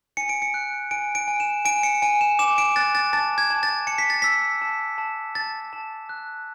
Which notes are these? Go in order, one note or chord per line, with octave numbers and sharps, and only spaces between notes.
G#5 C#7
D7
C#7
F#6
G#5 D7
D7
G#5
E7
G#5 D7
C#7
G#5 D7
E7
D6 E7
D7
F#6 A6
A6
A5 A6
G#6
A5
A6
A5 C#7
B6
A6
E6 B6
A5
A5
A5 A6
A5
F#6